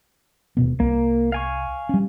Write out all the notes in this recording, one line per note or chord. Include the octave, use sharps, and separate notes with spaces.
D#1 B2 B3
C2 A#3
F5 G#5 C#6
G3 C#4